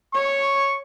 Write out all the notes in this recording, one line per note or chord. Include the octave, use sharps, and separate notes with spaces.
C#5 C#6